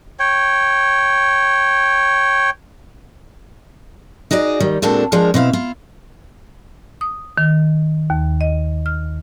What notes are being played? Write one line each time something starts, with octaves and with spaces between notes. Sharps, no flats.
C#5 G5
D#4 F#4 G#4 D5 D#5
D#3 G3
A#2 G#3 C4 D4 F#4 A4
F3 G#3 D4 G#4 A#4
B2 C4 E4 F5
E4 F4
D#6
D#3
D#2
D#5
F6